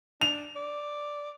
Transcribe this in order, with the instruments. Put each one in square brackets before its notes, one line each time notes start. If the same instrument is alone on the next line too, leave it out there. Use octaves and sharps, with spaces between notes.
[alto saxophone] D4 [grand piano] F7
[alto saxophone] D5